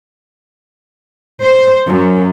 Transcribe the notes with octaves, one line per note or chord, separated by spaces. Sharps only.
C5
F#2